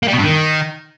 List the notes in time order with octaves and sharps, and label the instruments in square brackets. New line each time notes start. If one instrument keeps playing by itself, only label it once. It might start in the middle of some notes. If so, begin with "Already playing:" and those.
[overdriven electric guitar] A#3
G3
B2
G2
D#3